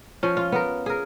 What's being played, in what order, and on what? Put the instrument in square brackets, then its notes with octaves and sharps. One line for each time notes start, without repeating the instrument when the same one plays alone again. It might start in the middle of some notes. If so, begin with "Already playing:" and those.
[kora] F3 C#4
F4
B3 A#4
G#4 A#4